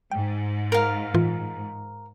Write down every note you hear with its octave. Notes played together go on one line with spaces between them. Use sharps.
G#2 G5
A#4 F5
A2 E3 F4